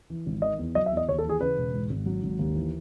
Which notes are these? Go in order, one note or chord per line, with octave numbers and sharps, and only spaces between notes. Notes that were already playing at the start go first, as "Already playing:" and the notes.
E3
G#1
D#3 D#5
E2
F#3 D#5
E5
E2
D#5
D#2 C#5
A4
E3
G#4
C#3 B4
E1
G#2
G#1
F#3
G#1
D#2
E3